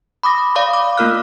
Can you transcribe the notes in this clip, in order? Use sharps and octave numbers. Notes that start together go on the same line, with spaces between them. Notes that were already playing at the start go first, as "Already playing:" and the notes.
B5 D6 D#6 A#6
D5 F5 B5 D6 D#6
D6
A3 A#3 F4 A#4 F6 F#6